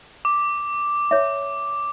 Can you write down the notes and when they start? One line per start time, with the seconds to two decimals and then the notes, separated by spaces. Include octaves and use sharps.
0.25 D6
1.11 C#5 E5